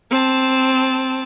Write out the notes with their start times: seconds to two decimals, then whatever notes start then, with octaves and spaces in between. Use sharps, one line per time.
0.11 C4 A5